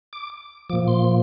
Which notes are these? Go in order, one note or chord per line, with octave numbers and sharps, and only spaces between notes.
D6
A#2 F3 D6
C6